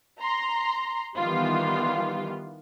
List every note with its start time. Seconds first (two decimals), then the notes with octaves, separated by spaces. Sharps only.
0.19 A#5 C6
1.17 D#3 E3 G3 B3 F4